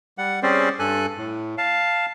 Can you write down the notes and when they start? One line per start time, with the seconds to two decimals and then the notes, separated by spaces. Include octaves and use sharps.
0.18 G3 F#5
0.43 G3 C4 C#4 G#4 C5 D5
0.79 G2 A4 G#5 F#6
1.17 A2
1.58 F5 A5